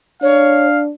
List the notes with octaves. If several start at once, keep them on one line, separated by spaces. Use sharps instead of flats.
D4 C#5 F5